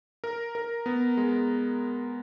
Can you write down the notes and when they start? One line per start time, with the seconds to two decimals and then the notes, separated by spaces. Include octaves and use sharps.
0.24 A#4
0.55 A#4
0.86 B3
1.17 G#3